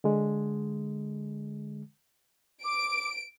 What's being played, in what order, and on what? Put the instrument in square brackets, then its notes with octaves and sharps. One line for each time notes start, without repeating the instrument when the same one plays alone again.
[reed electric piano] D3 G#3
[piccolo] D6 [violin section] D7